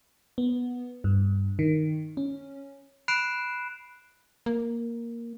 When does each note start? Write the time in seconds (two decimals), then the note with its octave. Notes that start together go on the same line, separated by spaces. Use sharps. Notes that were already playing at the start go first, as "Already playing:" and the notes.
0.38 B3
1.04 G2
1.59 D#3
2.17 C#4
3.08 B5 F#6 C7 D7 E7
4.46 A#3